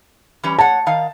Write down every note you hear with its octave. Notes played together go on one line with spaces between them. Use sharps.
E3 G3 C#4
C#5 F#5 A5
D#3 F5